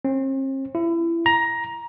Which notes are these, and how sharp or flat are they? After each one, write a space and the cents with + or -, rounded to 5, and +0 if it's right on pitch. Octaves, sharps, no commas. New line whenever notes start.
C4 +45
E4 +25
A#5 +15